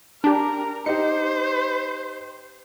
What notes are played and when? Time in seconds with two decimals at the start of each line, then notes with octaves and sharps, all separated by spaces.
0.24 D4 G4 A#4
0.86 D#4 G4 C5 C#7